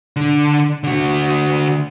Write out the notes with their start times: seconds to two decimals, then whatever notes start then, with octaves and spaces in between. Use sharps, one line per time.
0.16 D3
0.84 D3 F#4